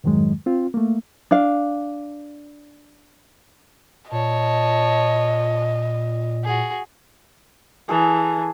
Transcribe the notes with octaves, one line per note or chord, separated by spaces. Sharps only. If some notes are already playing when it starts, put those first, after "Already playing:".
F2 G#2 D#3 F#3 G#3
C4 F4
A3 A#3
D4 F5
A#2 C#5 D#5 A5
F#4 G#4
E3 G#4 A4